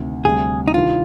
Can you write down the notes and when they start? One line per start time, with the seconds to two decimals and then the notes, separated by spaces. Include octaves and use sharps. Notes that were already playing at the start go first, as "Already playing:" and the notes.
Already playing: D2 C3 D#3
0.25 D2 C3 G3 G#4
0.68 D#4
0.74 C2 C3 D#3 G3 D4 F4